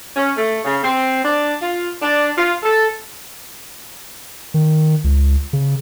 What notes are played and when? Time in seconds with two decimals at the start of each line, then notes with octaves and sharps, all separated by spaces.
0.16 C#4
0.37 A3
0.65 C#3
0.83 C4
1.24 D4
1.61 F4
2.02 D4
2.37 F4
2.63 A4
4.54 D#3
5.04 C#2
5.53 C#3